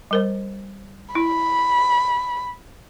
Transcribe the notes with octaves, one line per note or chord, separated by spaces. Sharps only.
G3 A#4 C5
E4 B5